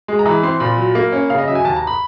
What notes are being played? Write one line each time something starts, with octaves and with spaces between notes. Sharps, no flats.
G#3
A#5
E3 B5
C4 C6
A#2 B5
F#3
A#3
C#4
C#3 F5
D#5
F#3 E5
G#5
D#2 A5
A#5
B5